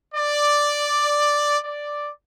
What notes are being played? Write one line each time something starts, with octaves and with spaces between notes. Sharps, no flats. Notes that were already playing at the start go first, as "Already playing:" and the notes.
D5
D5